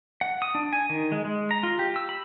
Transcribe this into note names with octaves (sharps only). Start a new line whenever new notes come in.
F#5
D#6
D4
G#5
D#3
G#3
G#3
A#5
F4
G4
E6
B5